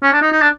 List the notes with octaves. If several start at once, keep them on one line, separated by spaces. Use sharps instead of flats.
C#4
D4
D#4
D#4
D4